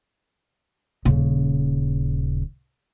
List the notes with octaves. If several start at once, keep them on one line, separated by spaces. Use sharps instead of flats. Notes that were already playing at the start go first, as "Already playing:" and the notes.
D#1 C#3